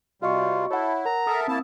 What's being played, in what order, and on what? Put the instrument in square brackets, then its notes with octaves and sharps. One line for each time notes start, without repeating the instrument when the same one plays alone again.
[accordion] C3 G3 [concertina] F4 [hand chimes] F#4 D#5 C#6
[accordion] E4 [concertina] A4 [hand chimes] C#5 F#5
[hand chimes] A#4 F#5 [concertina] A#5
[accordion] A4 A#4 E5 [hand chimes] D#6 E6
[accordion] A#3 E4 A5 [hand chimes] C4